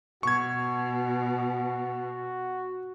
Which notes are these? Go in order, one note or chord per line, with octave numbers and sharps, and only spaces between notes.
B2 F#4 C#6 G#6